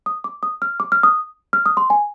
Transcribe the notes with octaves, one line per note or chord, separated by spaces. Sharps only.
D#6
D6
D#6
F6
D6
F6
D#6
F6
D#6
C6
G#5